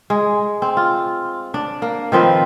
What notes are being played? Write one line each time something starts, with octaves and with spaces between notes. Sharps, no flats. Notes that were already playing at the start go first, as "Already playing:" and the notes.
G#3
C4
F4
D4
A#3
D#3 F3 C4 B4